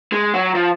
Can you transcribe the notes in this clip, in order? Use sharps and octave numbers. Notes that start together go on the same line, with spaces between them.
G#3
F#3
F3